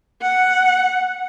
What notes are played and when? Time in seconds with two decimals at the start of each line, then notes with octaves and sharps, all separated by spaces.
0.22 F#5